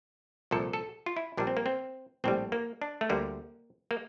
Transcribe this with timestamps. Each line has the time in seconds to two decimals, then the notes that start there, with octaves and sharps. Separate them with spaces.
0.51 C2 A#2 F3 A4
0.73 A4
1.06 F4
1.17 E4
1.37 A#1 A#2 G3 D4
1.47 C4
1.57 A#3
1.66 C4
2.24 A#1 A2 G3 C4
2.52 A#3
2.82 D4
3.01 A3
3.10 D2 D3 G3 A#3
3.91 A#3